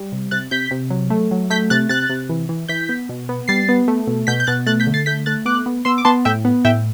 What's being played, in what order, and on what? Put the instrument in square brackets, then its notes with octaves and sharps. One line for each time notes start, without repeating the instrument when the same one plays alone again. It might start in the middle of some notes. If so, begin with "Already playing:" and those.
Already playing: [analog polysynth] G3
C3
C3 F#6 A6
C3 G6 B6
C3
F#3
A3
F#3
A3 G6 B6
C3 F#6 A6
C3 F#6 A6
C3
E3
E3
E3 G6 B6
B3
B2
B3
G3 A6 C7
B3
A3
B2
B2 G6 B6
G6
B2 F#6 A6
A3 F#6 A6
G6 B6
D3
A6 C7
A3 G6 B6
A3 F#6 A6
B3 D6 F#6
B3
B3 C6 E6
D6
B3 A5 C6
A2 E5 G5
B3
A2 E5 G5